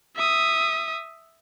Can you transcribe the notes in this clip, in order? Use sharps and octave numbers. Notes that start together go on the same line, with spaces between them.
E5 D#6